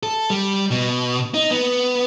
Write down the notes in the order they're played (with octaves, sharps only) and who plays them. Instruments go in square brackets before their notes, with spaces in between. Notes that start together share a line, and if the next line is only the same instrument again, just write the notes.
[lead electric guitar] A4
G3
B2
D#4
B3